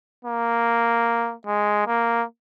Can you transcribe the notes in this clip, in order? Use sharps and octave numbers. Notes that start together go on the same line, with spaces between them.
A#3
G#3
A#3